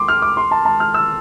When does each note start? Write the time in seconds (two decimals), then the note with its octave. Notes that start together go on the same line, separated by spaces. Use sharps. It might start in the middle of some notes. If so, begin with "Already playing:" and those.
Already playing: C6 D6
0.08 F6
0.22 D6
0.37 C6
0.51 A5
0.65 A5
0.80 F6
0.94 E6